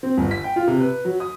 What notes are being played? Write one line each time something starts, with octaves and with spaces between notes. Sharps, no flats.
C4
G1
B6
G5
F4
C3
B4
F#3
D#6